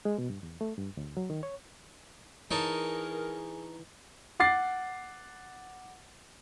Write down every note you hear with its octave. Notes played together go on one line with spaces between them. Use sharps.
G#3
B2
G2
E2
A3
G2
D2
F#3
D#3
C#5
E3 D#4 G#4 A#4 C#5 A5
F#5 D6 A6 C7